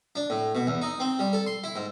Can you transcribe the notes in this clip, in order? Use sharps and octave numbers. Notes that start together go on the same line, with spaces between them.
D4
A2
B2
E2
D#4
C4
G3
A4
C6
E4
G#2